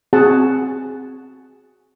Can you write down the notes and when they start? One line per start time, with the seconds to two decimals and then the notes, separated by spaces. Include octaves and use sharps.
0.13 C4 F#4 G#4 F#5 A5